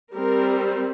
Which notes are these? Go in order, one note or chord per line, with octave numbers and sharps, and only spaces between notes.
G3 C4 A#4